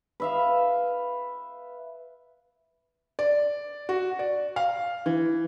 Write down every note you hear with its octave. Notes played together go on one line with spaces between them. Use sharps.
B4 E5 F5
D5
F#4
D5
F5
E3